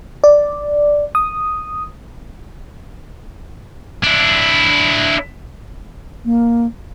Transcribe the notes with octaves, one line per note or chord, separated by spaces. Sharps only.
D5
D#6
D4 E4
A#3